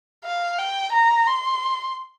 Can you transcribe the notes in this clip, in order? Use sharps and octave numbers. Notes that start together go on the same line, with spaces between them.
F5
G5
A#5
C6